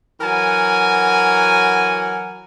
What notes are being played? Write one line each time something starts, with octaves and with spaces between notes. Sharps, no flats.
E3 F#3 A#4 F#5 G#5